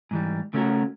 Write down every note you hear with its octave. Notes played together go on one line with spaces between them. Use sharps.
G#2 E3 G3
C#3 A3 C#4 D#4 F#4 A#4